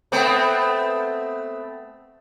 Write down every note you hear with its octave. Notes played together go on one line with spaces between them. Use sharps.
A3 B3 C4